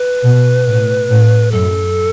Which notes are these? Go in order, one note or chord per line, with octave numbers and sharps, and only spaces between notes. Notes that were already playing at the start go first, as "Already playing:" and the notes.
Already playing: B4
B2
A2
A2
F#2 A4